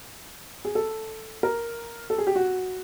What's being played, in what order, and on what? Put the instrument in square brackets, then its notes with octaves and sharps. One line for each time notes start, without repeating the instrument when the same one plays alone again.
[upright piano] G#4
A4
A#4
A4
G#4
G4
F#4